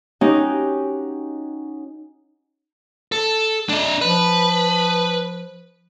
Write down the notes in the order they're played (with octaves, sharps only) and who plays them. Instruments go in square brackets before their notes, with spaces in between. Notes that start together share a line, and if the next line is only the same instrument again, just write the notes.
[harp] C#4 D#4 F#4 G4
[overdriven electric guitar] A4
D4 D#5
[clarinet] F3 [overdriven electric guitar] B4